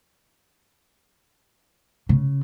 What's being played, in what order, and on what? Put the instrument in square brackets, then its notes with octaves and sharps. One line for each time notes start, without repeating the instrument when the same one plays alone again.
[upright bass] C#3